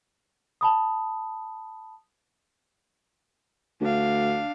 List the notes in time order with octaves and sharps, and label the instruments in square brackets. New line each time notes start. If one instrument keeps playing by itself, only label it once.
[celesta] A5 B5 D#6
[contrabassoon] D2 [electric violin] D4 F5